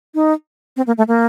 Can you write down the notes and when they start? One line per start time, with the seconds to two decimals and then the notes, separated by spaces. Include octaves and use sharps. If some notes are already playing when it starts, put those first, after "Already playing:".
0.15 D#4
0.77 C4
0.87 A#3
0.98 A3
1.08 A#3